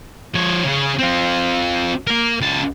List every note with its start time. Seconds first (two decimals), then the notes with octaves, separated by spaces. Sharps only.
0.35 F3 C#5
0.65 C#3 G#4
0.99 C4 F4
2.07 A#3 A#4
2.40 C#2 A5